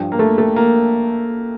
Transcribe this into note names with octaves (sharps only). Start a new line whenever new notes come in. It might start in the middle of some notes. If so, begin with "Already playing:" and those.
Already playing: G2 F3
A#3
A3
A3
A#3